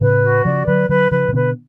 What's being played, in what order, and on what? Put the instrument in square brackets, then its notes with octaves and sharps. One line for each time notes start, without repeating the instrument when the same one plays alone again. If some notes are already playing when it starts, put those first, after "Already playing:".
[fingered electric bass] A2 C#3 [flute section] B4
[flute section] F#4
[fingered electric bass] C#3 F3 [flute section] D5
[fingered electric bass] D3 F#3 [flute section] B4
[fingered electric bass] D3 F#3 [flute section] B4
[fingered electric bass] C#3 F3 [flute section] B4
[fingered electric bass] C#3
[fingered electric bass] B2 D3 [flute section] B4